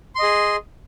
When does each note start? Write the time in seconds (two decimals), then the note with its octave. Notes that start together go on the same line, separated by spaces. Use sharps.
0.15 C6
0.19 D#5
0.23 G#4